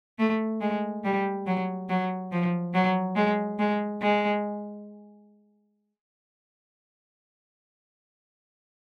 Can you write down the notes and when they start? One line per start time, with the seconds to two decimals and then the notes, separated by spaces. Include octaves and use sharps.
0.19 A3
0.61 G#3
1.04 G3
1.47 F#3
1.89 F#3
2.32 F3
2.74 F#3
3.16 G#3
3.59 G#3
4.02 G#3